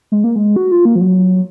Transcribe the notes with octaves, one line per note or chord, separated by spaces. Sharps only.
G#3
A#3
G#3
F#4
F4
A#3
F3
F#3